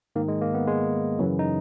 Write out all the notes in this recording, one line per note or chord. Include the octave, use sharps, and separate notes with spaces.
G#2 D#3 A#3
G#3
A#3
B3
G#3
F#2 C#3 E3 F#3
D#4